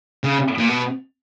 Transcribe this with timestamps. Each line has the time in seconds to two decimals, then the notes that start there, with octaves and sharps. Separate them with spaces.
0.24 C#3
0.58 A#2
0.68 B2